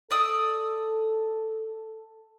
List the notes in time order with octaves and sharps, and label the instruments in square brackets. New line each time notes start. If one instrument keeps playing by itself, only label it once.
[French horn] A4 [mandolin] D5 D#6 E6